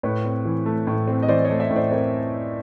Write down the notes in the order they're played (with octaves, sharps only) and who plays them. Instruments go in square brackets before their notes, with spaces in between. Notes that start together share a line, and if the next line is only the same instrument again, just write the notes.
[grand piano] A2 B4 C#5
C4
E3
A3
A2
C4
D#5
E3 C5 D5
C#5 D#5
A3
D5 E5
A2
C5 D5
C4 A#4 C5